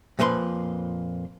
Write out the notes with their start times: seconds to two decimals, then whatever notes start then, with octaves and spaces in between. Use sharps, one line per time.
0.19 F2 A#2 F3 B4 C6